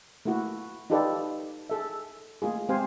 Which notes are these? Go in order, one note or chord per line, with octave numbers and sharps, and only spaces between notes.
A3 A#3 E4 F#4
D#4 F4 G4 A4 B4 D5
G#4 A4 E5
A3 A#3 F4 G#4
G#3 C4 G4 C5 F5 G#5